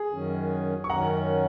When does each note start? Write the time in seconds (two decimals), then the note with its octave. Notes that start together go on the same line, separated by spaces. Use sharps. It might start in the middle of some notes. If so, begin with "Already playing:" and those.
Already playing: G#4
0.12 F#2 D#3 F#3 C#4
0.84 C#6
0.89 F#2 D#3 F#3 C#4 F#5 A#5